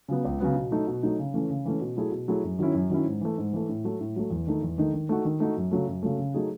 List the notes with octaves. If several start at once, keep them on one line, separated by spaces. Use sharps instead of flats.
C#3 F#3 B3
C#2
C#3 F#3 B3
B2
F#3 A3 D#4
B2
F#3 A3 D#4
C#3
E3 A3 C#4
C#3
E3 A3 C#4
B2
F#3 A3 E4 G#4
B2
F#3 A3 E4 G#4
F#2
D#3 F#3 C#4 E4
F#2
D#3 F#3 C#4 E4
G#2
E3 A3
G#2
E3 A3
A2
F#3 A3
A2
F#3 A3
E2
D#3 A3 D#4
E2
D#3 A3 D#4
D#3
A3 D#4 F#4
D#3
A3 D#4 F#4
F#2
C#3 F#3 A3
F#2
C#3 F#3 A3
C#3
F#3 A3 D#4 G#4